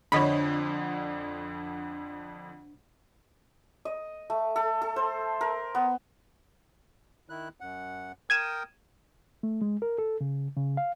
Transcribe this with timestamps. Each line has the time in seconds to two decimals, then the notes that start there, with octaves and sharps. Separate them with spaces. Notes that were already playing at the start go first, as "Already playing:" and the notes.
0.12 F2 D3 D4 C#5 D#5 B5
3.85 D#5
4.30 A3
4.56 A4
4.82 A4
4.96 C5
5.41 A#4
5.75 B3
7.29 D#3 E4 F#6
7.60 F#2 F#5
8.30 A#4 G5 D#6 G#6 D#7 E7
9.43 A3
9.61 G#3
9.82 A#4
9.98 A4
10.21 C#3
10.56 C#3
10.77 F5